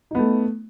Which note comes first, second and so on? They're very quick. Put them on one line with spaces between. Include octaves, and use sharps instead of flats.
D#4 B3 A3